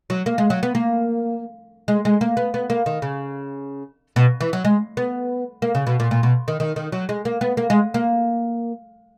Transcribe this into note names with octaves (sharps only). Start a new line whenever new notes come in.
F#3
A#3
G#3
F#3
B3
A#3
G#3
G#3
A#3
B3
B3
A#3
D#3
C#3
B2
E3
F#3
G#3
B3
A#3
C#3
B2
A#2
A#2
B2
D#3
D#3
D#3
F#3
G#3
A#3
B3
A#3
G#3
A#3